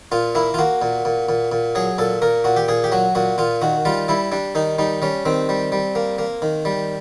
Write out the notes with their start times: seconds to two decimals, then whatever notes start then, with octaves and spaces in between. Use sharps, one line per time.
0.12 A#2 F4
0.35 A#3 E4
0.54 F4
0.58 A#3 F#4
0.82 A#2
1.05 A#2
1.29 A#2
1.52 A#2
1.75 F#3 G#4
1.98 A#2 A4
2.22 A#2 A#4
2.44 A#2 F#4
2.56 G4
2.68 A#2 G#4
2.84 G4
2.92 F#3 F#4
3.15 A#2 F#4
3.38 A#2 F4
3.62 D#3 F#4
3.85 G3 F4
4.08 G3 E4
4.32 G3 D4
4.55 D#3 D#4
4.79 G3 D#4
5.02 G3 C#4
5.25 D#3 C4
5.49 G3
5.72 G3
5.95 A#3
6.19 A#3
6.42 D#3
6.65 G3